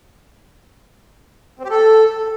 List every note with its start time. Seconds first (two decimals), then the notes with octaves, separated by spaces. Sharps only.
1.59 C4
1.65 G4
1.70 A4